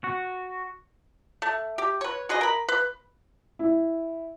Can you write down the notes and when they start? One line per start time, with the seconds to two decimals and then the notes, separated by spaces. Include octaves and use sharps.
0.04 F#4
1.42 A3
1.78 G4
2.01 B4 C#5
2.29 F#4 G#4 B4 D#5
2.41 A#4 B5
2.69 B4
3.59 E4